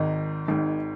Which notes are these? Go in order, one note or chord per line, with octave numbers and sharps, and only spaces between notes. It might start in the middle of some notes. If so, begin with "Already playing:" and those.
Already playing: G#1 G#2 D#3 D#5
G#1 G#2 D#3